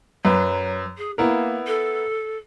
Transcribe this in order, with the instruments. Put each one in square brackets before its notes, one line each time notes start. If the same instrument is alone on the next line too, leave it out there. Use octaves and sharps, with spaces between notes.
[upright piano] F#2 B4 [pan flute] F#3
[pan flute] G#4
[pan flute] A#3 [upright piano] B3 E4 A#4
[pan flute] A4